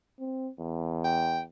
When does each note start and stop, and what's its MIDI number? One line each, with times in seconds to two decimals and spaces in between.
0.19 0.50 60
0.60 1.47 40
1.04 1.40 79